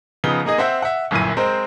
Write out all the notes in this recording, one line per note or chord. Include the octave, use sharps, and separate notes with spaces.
C#3 F3 B3 D#4 G7
A#3 D#4 G#4 D#5
C4 C5 E5 F#5
E5 F#5
G1 F#2 A#2 E4 D#7
G#3 C4 A#4 C5